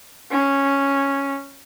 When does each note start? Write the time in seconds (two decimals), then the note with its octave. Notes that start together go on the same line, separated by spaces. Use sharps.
0.31 C#4